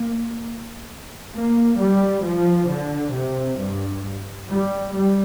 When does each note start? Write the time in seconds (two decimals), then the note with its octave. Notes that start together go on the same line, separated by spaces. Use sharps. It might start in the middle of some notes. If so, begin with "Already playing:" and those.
Already playing: A#3
1.35 A#3
1.79 G3
2.24 F3
2.69 D3
3.14 C3
3.58 G2
4.48 G3
4.94 G3